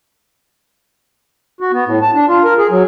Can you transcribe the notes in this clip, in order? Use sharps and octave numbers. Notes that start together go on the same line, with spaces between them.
F#4
B3
A2
A5
D4
F4
A#4
G#4
F#3